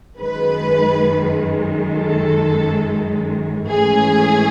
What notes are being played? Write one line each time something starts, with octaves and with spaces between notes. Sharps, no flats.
F#2 D#3 G#3 B4
A4
G#2 E3 A3 C#4 E4 G#4